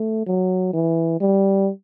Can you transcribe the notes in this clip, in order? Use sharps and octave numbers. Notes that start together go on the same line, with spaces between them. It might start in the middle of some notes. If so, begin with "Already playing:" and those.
Already playing: A3
F#3
E3
G3